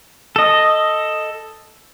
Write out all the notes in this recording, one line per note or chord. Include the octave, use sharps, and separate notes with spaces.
A4 D#5